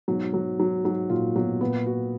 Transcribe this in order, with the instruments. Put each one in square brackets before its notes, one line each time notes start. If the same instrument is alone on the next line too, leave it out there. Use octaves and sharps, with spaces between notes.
[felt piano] G#2 B2 [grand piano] F#3
[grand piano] F#3
F#3
[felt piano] G#2 [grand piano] F#3
[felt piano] A#2 [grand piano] F4
[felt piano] G#2 B2 [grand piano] F#3
[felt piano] A#2 [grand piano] B3
[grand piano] F#4